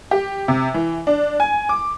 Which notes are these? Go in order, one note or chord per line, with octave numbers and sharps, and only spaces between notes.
G4
C3
E3
D4
G#5
D6